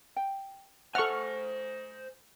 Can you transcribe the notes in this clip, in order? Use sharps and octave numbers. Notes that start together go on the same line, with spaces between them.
G5
A4 C5 E5 F#5 G#5 C#6 F6